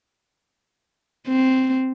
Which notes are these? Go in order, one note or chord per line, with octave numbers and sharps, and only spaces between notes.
C4